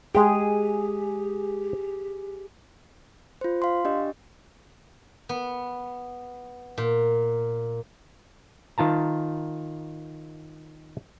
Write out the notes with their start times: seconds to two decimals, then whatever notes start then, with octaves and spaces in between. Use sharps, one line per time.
0.15 G#3 G4 G#4 G5
3.41 F4 C5
3.62 F5 C6
3.85 D4 G4 D#5
5.29 B3
6.78 A#2
8.78 D#3 F4 A5 A#5